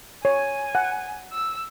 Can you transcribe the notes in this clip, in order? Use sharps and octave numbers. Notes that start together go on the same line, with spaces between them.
C#5 G#5
F#5
E6